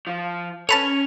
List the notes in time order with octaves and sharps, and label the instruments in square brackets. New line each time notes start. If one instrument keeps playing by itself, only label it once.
[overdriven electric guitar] F3
[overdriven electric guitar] C#4 C#5 [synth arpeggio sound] A4 B4 A5 [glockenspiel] F7